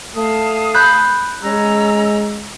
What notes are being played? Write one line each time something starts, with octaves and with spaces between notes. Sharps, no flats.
A3 F5 A5 D#6
B5 F#6 G6
G#3 C#4 A#5 E6